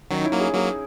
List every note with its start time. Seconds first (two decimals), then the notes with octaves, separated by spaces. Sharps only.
0.11 D#3 F#3 C#4
0.20 D#4
0.25 E4
0.33 F#3 A#3
0.40 G#4
0.54 F#3 A#3 G#4